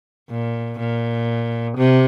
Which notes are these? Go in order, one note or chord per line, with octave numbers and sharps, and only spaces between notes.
A#2
A#2
C3